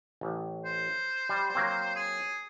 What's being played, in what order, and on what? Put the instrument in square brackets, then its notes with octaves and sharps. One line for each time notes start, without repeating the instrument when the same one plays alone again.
[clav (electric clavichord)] A1
[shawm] C5
[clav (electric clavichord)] G3
F#3 A#3 C4
[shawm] G#4